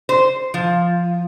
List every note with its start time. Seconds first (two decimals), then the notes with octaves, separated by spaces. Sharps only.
0.09 C5
0.54 F3